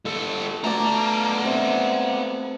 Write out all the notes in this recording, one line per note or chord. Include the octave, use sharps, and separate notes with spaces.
G3 A4
A3 B3 F#4 D5 A#5
C3